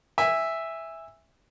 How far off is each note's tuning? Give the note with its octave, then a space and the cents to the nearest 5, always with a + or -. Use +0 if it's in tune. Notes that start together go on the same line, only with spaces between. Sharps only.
E5 +0 G#5 -25